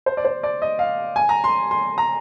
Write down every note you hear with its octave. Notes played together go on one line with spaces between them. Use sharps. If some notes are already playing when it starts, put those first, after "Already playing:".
C5
D5
C5
D5
D#5
F5
G#5
A#5
C6
C6
A#5